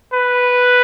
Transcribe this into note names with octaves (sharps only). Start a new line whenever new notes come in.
B4